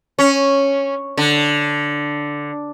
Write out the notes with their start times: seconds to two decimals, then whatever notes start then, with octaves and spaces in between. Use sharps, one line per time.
0.19 C#4
1.17 D3